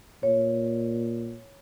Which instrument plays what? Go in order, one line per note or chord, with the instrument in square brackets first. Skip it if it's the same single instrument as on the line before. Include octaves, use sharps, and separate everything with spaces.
[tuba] A#2 [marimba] C#5